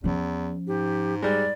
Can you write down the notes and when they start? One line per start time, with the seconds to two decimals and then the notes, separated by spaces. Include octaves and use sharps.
0.04 E2 F3 C#4
0.67 G#2 G4
1.22 G3 G#3 D5